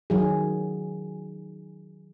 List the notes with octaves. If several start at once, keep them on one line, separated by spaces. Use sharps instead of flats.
D#3 F#3 G#4